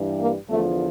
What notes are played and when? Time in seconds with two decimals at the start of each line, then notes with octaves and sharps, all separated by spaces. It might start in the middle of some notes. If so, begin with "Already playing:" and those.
Already playing: G2 E3 G3
0.19 A#3
0.49 E2 D3 F3 A3